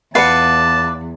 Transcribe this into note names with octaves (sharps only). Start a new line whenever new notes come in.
E2 F4 B4 D5 F5 F#5 A5